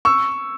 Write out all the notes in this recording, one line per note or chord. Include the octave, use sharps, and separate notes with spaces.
C#6 E6